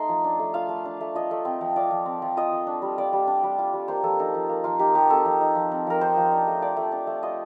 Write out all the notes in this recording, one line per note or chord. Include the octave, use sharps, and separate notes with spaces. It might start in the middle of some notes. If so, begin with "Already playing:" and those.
Already playing: A3 D#4 C6
F3
D4
A3
F4 F5
A3
D4
A3
F4 D#5
A3
C4
F3
F4 D5
F3
C4
F3
F4 D#5
F3
D4
G3
F4 D5
G3
D4
G3
F4
G3
A#3 C5
F3 A4
D#4 A4
F3
A#3
F3 F4
D#4 G4
F3 G4
C4 A4
F3
D#4
F3
C4
F3 A#4
D#4 C5
F3
D4
A3
F4 D5
A3
D4
A3
F4 D#5